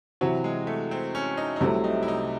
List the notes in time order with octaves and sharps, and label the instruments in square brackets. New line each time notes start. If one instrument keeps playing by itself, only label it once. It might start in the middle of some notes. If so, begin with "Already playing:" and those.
[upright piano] C3 E3 C4 F#4 [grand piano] F#3
[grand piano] G#3
A3
C4
C#4
D#4
D#4
[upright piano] C2 C3 F#3 A3 C4 [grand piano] E4
[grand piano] D#4
E4
D#4